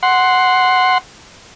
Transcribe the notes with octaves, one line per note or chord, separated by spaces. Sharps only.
F#5 C6